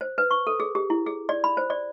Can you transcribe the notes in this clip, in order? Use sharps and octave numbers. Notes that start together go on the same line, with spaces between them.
C5
B4
C#6
A4
G#4
G4
E4
G#4
D5
B5
C5
D5